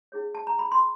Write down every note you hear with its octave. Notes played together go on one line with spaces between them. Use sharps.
C#4 E4 G#4 C#5
A5
A#5
B5
C6